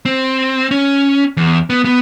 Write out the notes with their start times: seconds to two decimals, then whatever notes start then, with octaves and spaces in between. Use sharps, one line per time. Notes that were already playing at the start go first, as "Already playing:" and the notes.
0.05 C4
0.71 C#4
1.37 E2
1.70 B3
1.85 B3